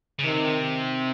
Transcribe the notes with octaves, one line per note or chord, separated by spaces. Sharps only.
C#3
C3 D#3